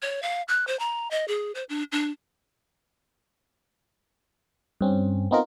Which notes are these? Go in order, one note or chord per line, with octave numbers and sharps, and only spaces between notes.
C#5
F5
F#6
C5
A#5
D#5
G#4
C5
D4
D4
G2 C4 C#4
B3 C4 D#4 F4 A#4